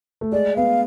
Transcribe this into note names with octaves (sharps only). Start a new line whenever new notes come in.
A3
G#3 D5
B3 F5